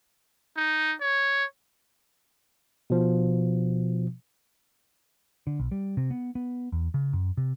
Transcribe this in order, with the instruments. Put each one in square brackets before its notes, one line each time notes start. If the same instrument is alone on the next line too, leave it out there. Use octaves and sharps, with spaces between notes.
[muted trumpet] D#4
C#5
[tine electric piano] B2 F3
[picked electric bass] D3
B1
G3
C3
B3
B3
E2
C#3
F#2
C3